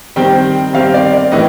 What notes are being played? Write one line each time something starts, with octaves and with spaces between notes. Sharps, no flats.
D#3 G3 C4 G5
D#3 G3 C4 F5
D5
D5
A2 E3 D#5